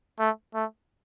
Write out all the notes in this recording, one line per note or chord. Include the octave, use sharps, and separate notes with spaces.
A3
A3